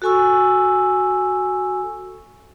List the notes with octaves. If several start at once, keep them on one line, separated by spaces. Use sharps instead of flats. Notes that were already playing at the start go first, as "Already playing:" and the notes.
F#4 A4 G#5 C#6 E6